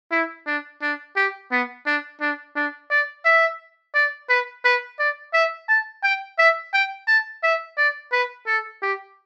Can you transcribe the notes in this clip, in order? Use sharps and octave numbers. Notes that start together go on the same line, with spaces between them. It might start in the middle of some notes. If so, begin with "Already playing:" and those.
E4
D4
D4
G4
B3
D4
D4
D4
D5
E5
D5
B4
B4
D5
E5
A5
G5
E5
G5
A5
E5
D5
B4
A4
G4